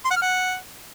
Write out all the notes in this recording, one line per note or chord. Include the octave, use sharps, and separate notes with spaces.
C6
F#5
F6
F#5